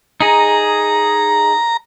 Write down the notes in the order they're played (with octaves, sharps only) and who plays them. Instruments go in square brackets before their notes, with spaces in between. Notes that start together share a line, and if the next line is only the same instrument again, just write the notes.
[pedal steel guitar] D#4 G#4 [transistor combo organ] A#5